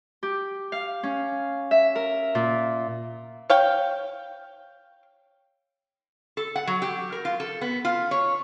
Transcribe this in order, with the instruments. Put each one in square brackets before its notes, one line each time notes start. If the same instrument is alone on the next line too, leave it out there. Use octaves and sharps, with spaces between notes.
[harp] G4
F5
C#4
E5
A#4
A#2
[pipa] C#5 F5 G5
[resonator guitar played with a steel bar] A4
F#5
F#3
G4
A#4
F4
A4
B3
F4
C#5